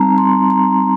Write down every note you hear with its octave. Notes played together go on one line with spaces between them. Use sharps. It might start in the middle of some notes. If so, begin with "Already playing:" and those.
Already playing: G3 C4 D#4 A5 A#5
C6
A#5